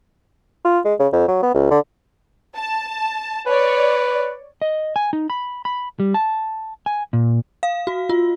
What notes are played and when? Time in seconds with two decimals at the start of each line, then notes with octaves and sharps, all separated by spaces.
0.65 F4
0.85 G#3
1.00 C#3
1.13 F2
1.28 F#3
1.43 B3
1.55 C#2
1.71 D3
2.55 A5
3.46 B4 C#5 D5
4.62 D#5
4.96 G#5
5.13 D#4
5.30 B5
5.65 B5
6.00 G3
6.14 A5
6.86 G#5
7.13 A#2
7.63 F5
7.87 F#4
8.09 F4